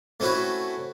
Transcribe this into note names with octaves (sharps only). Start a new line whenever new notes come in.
A3 C4 C#4 E4 F#4 B4